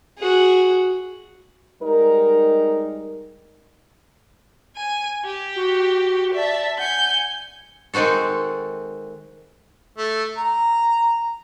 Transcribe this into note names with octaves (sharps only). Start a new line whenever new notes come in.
F#4 G#4
G3 G#3 D#4 A#4
G#5 D#7
G4
F#4
D5 E5 A5
F#5 G#5 G6
D#3 G#3 C4 F#4 A4
A3
A#5